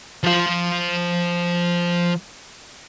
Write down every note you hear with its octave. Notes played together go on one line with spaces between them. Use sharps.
F3 F5